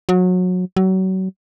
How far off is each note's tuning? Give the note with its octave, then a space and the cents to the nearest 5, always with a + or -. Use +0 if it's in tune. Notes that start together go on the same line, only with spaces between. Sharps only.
F#3 -25
F#3 +30